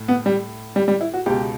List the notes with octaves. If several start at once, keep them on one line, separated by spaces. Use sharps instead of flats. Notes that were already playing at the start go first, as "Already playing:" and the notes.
Already playing: A2
B3
G3
G3
G3
E4
F#4
C#2 B2 G4